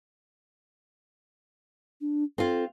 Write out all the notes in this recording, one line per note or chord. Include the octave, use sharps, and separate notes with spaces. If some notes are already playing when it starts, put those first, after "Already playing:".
D4
C4 F4 A4